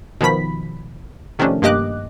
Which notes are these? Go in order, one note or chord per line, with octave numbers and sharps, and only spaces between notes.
B2 D#3 F3 B5 B6
C3 D#3 F3 A3 C#4 D4
G2 A#3 G4 D#5 D6 F#6